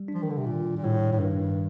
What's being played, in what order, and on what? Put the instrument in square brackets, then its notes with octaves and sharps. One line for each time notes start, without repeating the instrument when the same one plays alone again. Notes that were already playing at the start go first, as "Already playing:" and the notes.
Already playing: [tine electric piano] G3
D4
[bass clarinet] F3
D#3
D3
C3
[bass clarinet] A#2 [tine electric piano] D#3
[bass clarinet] A#2
[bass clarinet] A2 [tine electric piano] G3
[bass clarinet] A2
[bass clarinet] G2 [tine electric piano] D#3